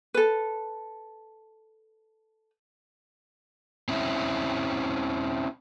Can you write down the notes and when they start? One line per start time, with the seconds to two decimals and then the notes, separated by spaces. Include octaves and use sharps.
0.14 A4 B4
3.89 C4 C#4 E4